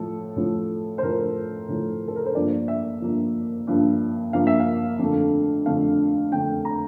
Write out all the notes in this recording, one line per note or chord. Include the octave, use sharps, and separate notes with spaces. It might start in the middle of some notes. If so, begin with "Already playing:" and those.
Already playing: A2 F3 A3 A4
A2 F3 A3
C5
A2 F3 A3 A#4
A2 F3 A3
A4
A#4
C5
G2 F3 A#3 D5
E5
G2 F3 A#3
G2 F3 A#3
G2 F3 A#3 F5
E5
F5
F2 D3 A3
F2 D3 A3 F5
F2 D3 A3 G5
A#5